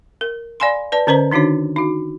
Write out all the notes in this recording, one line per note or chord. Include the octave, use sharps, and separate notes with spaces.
A#4
D5 F5 G#5 B5 C6
B4 D5 A5
D3 C#4 B4 C5 D#5 A#5
D#3 D4 D#4 F#4 C#5
D#4 F#4